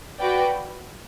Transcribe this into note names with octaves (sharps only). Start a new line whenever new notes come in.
F#4 B4 D5 G5